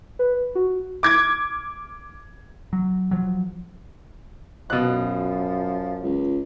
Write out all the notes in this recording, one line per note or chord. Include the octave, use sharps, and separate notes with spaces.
B4
F#4
D6 G#6
F#3
F3 F#3
F#2 B2 F3 F#6
C#2